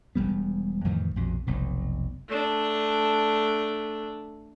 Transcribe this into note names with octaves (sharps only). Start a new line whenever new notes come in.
E1 G2 G3 B3
F2 A2 D#3 E3
A#1 F2 B2
F1 B1 C3
A3 D4